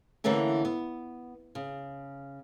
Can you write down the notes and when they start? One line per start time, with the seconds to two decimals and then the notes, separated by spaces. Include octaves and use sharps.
0.24 D3 E3 A3 A#3 C#4
0.65 B3
1.55 C#3